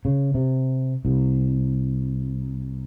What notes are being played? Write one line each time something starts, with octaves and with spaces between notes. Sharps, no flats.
C#3
C3
C2